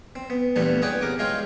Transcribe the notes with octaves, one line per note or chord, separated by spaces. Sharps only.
C4
B3
G2 A#2 E3 G3 A3 B3
B3 G#4 C#5 D5 F#5 G5
C2 A#4 D6
G#3 F4 C#5 F5 G5